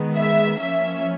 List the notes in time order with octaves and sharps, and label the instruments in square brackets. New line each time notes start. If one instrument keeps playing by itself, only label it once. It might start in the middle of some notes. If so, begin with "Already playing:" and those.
Already playing: [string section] D#3 G#3 B3
E5
F3 A#3 C#4 E5